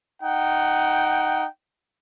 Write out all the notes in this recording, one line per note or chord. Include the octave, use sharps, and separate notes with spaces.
D#4 F#5 G5